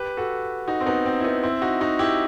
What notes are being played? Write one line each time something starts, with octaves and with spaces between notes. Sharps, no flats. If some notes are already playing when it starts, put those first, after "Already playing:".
Already playing: G4 B4
F#4 A4
D#4 F#4
C4
B3 D#4
C4
E4
B3 D#4
C4 E4
D#4 F#4
D#4 F#4
E4 G4